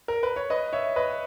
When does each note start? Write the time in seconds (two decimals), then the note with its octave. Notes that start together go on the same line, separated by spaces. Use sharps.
0.08 A#4
0.23 B4
0.36 C#5
0.50 B4 D#5
0.73 C#5 E5
0.96 B4 D#5